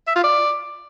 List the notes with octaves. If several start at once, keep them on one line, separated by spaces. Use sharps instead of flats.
E5
F4
D5